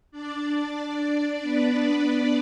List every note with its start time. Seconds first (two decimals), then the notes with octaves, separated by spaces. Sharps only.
0.11 D4 D5
0.55 D4 D5
1.42 B3 B4